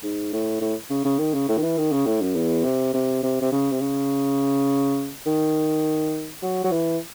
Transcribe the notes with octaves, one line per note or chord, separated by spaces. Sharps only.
G#2
A2
A2
C#3
C#3
D#3
C#3
A2
D#3
E3
D#3
C#3
A2
F#2
E2
C3
C3
C3
C3
C#3
C3
C#3
D#3
F#3
F#3
E3